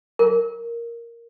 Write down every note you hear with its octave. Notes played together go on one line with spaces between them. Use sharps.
A#4